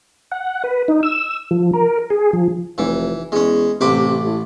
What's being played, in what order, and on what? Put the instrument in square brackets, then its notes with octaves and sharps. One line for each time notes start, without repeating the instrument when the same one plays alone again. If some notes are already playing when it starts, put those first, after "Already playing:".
[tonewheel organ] F#5
B4
D#4
E6
F3
A#4
G#4
F3
[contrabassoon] F1 [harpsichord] E3
[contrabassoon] E2 [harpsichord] G#3 C#4
[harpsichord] A1 B4 D6 [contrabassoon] C3
[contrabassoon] A2